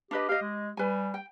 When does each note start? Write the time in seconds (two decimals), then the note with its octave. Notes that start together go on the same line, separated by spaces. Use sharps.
0.11 D4 G4 B4 D#5
0.29 G4 D#5 F5
0.41 G#3
0.77 G3 B4 G#5
1.14 G5